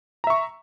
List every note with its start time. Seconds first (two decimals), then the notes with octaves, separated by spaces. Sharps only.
0.24 A#5
0.27 E5
0.30 C#6